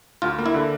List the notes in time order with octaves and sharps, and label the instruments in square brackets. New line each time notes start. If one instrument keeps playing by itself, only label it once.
[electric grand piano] D2 [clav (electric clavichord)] F4
[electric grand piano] A#3
[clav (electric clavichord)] E4
[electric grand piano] D3